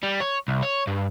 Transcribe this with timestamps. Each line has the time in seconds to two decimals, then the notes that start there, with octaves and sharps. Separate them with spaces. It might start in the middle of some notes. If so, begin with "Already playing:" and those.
0.03 G3
0.21 C#5
0.48 C2
0.63 C#5
0.87 G2